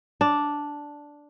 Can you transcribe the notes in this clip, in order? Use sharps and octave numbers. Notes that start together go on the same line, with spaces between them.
D4